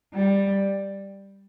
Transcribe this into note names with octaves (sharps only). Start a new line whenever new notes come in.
G3